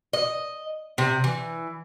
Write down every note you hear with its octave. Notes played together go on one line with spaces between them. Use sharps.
D#5
C3
E3